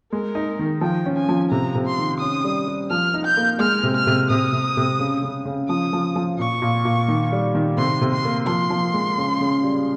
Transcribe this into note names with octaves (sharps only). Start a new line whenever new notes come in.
G#3 A#4
D#4
D#3
F3 G5
C#4
G#5
F3
C3 A#5
C3
C6
D#3
C#4 D#6
G3
G3
F3 F6
D#4
G6
A#3
G#3 F6
C3
F6
C3
C3 D#6
C3
C3
C#3
C#3
C#3
F3 D#6
F3
F3
A#2 C#6
A#2
A#2
D#3
G3
D#3
C3 C6
C3
C6
A#3
F3 C6
F3
G#3
C#3
C#3
G3